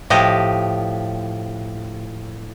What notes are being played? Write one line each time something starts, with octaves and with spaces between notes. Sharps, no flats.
A2 F3 G4 D#5